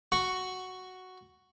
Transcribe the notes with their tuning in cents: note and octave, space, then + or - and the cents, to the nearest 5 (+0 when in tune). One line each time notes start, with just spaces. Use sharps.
F#4 +0 C#6 +0